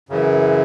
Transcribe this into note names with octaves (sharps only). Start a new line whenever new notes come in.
F#2 C#3 E3